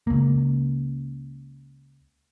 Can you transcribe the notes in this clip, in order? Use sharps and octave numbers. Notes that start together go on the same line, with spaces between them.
C#2 A#3